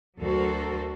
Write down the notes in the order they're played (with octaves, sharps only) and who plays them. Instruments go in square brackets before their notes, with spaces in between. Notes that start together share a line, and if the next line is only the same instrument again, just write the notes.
[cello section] D2 F#3 F#4 A4 A#4 C5